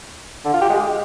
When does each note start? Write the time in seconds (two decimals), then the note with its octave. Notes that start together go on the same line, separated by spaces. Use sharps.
0.45 D3
0.53 F4
0.61 G4
0.70 G#3